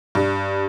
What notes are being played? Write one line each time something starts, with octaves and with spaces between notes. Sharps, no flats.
G2